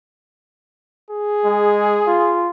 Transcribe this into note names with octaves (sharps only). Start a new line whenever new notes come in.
G#4
G#3
F4